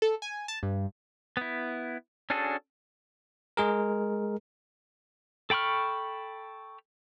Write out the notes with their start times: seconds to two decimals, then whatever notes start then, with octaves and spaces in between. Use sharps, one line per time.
0.02 A4
0.22 G#5
0.48 A5
0.63 G2
1.37 B3 E4
2.30 C#4 D4 F#4 G#4 A4
3.57 G#3 G#4 A#4
5.50 A4 G5 B5 C#6 F6